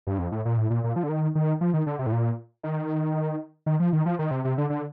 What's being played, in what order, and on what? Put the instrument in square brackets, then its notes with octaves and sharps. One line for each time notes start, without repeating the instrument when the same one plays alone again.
[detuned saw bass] G2
F2
A2
A#2
A2
A#2
A#2
F3
D3
D#3
D#3
F3
D#3
D3
C3
A2
A#2
D#3
D#3
F3
D#3
F3
D#3
C3
C3
D3
D3